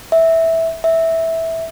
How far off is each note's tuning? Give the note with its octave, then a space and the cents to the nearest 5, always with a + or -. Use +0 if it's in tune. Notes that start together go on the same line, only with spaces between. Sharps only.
E5 -10
E5 -10